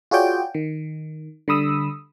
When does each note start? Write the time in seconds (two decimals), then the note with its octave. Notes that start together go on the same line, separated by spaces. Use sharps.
0.11 F4 F#4 G#4 C#5 D5 G5
0.55 D#3
1.48 D3 G3 B5 D#6 E6